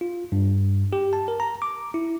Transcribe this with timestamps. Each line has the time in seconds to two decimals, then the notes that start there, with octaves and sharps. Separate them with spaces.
0.01 F4
0.32 G2
0.93 G4
1.13 A5
1.28 A#4
1.40 A#5
1.62 D6
1.94 E4